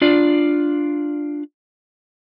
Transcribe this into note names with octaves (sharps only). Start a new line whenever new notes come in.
D4 F4 D5